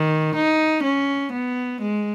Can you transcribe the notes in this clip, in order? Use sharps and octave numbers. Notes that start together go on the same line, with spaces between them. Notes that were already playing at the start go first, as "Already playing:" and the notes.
Already playing: D#3
D#4
C#4
B3
G#3